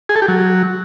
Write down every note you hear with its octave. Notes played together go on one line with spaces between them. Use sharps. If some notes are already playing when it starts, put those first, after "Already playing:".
G#4
A4
G4
F#3